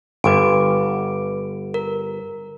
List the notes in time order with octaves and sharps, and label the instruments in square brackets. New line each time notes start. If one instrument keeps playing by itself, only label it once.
[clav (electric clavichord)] G1 [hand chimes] B4 D6 D7
[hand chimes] A#4